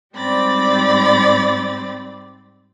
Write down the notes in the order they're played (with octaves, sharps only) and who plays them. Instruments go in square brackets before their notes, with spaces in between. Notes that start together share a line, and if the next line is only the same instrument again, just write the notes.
[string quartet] G#2 G3 C4 D5 B5 A6